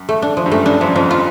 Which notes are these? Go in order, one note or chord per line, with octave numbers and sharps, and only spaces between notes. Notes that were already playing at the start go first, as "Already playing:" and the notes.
Already playing: F#2
A3
D4
F3
G2
F#2 A3
G2 D4
F#2 F3
F2 F3
F4